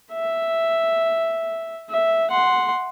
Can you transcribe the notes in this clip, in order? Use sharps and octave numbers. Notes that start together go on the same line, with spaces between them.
E5
E5
F#5 C6